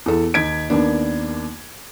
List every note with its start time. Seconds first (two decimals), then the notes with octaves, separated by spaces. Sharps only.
0.06 E2 A4
0.34 D#2 D#4 G#6 B6 D7
0.70 D#2 A#3 B3 D4